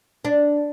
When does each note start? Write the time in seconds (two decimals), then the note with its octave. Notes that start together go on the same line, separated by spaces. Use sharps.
0.25 D4